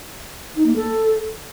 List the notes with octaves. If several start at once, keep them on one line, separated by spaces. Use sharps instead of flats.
D#4
A#3
A4